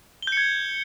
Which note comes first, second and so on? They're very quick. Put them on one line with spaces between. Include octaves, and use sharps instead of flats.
G7 G6 C#7 G#6